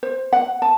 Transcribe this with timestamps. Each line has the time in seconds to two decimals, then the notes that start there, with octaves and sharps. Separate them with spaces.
0.03 C5
0.33 F#5
0.62 A5